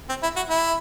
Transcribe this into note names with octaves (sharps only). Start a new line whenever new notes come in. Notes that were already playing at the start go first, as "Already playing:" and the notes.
C4
E4
F#4
E4